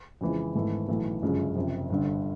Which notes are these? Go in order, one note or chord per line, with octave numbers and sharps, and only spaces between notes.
F2 C#3 E3 G#3
G#1 G#2 E3 A3
B1 A2 E3 A3
G1 F#2 C#3 F3 G#3
F#1 F2 C3
G1 G2 D3